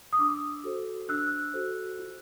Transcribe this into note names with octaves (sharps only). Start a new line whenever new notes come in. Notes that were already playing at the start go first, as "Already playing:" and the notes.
D#6
D4 D6 E6
F#4 A4 C5
D4 E6 F#6
F#4 A4 C5
F4